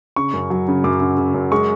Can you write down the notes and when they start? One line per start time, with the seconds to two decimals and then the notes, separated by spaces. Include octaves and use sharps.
0.16 C#3 C#6
0.34 F#2
0.50 F#3
0.68 C#3
0.84 F#2 D6
1.00 C#3
1.17 C#3
1.34 F#2
1.52 G#3 C#6